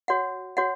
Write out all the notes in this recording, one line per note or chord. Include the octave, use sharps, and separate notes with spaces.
F#4 C#5 F#5
F#4 C#5 F#5